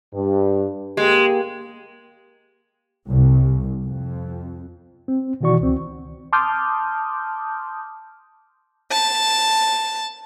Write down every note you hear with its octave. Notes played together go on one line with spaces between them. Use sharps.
G2
G#3 A#3 G4
C2
F2
C4
B2 D#3 E3 F#4 D5 C#6
C#2 C4
A5 C6 D6 D#6 F6 G6
A5